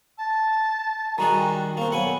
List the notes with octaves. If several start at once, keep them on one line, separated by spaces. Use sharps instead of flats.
A5
D#3 G3 F#4 G#4 A#5
A#3 C4 C#6
B1 F#5 G#5 B5